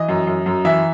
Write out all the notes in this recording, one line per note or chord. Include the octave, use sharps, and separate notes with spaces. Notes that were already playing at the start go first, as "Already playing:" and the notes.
Already playing: E3 D#5
F#2
F#2
F#2
E3 E5